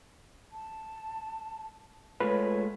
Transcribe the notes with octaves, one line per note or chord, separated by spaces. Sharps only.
A5
G#3 A3 F4 B4 C#5